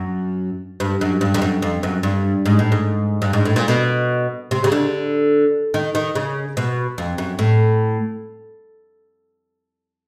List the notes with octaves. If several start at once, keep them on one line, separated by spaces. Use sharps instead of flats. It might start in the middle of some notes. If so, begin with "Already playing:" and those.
Already playing: F#2
G2
F#2
G2
F2
F#2
F2
F#2
G2
G#2
A2
G#2
G2
G#2
A2
A#2
B2
C3
C#3
D3
D#3
D#3
C#3
B2
F2
F#2
A2